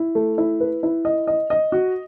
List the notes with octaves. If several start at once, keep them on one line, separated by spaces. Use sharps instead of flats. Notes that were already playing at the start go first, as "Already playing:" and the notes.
Already playing: E4
A3
E4
B4
E4
D#5
D#5
D#5
F#4